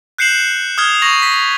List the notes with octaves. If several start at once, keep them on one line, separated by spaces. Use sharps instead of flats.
F#6 G6 C7 C#7 E7 F#7
D#6 F6 G#6
C#6 A#6 F#7
B6